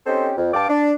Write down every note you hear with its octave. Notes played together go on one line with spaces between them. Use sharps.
C4 C#4 D#4 G4 A4 C5
F2
G2 F5 G5 A5 D6
D4